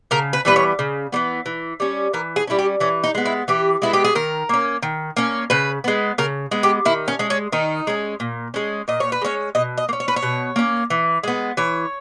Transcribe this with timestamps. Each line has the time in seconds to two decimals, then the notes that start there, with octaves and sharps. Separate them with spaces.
0.11 C#3 A#4
0.33 B4
0.45 E3 G3 B3 B4
0.56 C#5
0.79 C#3
1.12 E3 G3 B3
1.46 E3
1.80 G3 C#4
2.13 E3 A#4
2.36 G#4
2.47 G3 C#4 E4
2.59 G4
2.80 E3 C#4
3.04 D#4
3.15 G#3 B3
3.25 E4
3.48 E3 G4
3.82 G#3 B3 E4
3.93 G4
4.04 G#4
4.15 D#3 A#4
4.49 A#3 C#4
4.83 D#3
5.17 A#3 C#4
5.50 C#3 B4
5.84 G#3 B3
6.18 C#3 A#4
6.51 G#3 B3
6.63 G4
6.85 D#3 E4
7.08 C#4
7.19 G#3 C#4
7.30 C#4
7.52 D#3 D#4
7.87 G#3 C#4
8.20 A#2
8.54 G#3 C#4
8.88 A#2 D#5
9.00 C#5
9.12 B4
9.22 G#3 C#4 C#5
9.55 B2 D#5
9.78 D#5
9.89 A#3
9.93 C#4
10.00 C#5
10.08 B4
10.16 C#5
10.23 B2
10.56 A#3 C#4
10.90 E3
11.23 G#3 B3
11.57 E3 C#5